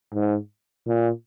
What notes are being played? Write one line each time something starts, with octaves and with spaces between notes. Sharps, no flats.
G#2
A#2